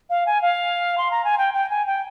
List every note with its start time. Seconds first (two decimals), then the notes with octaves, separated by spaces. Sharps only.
0.10 F5
0.26 G#5
0.42 F5
0.98 C6
1.11 A#5
1.25 G#5
1.38 G5
1.54 G5
1.70 G#5
1.86 G5